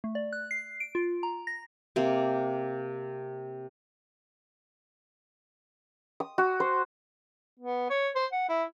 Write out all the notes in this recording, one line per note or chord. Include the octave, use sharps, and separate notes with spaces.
A3
D5
F#6
C7
D7
F4
A#5
A#6
C3 A#3
D#6
F#4
C5
B3
C#5
C5
F#5
E4